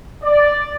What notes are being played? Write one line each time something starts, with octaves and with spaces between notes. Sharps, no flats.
D5